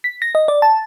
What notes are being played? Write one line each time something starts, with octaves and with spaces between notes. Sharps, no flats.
B6
A#6
D#5
D5
A5